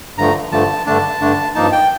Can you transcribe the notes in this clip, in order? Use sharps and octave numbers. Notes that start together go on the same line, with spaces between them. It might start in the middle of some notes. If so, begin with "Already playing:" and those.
G2 D3 F3 A3 A#5
G2 D3 F3 A3 A5
G2 D3 A3 D4 A5
G2 D3 A3 D4
G2 F3 A#3 D#4 A5
G5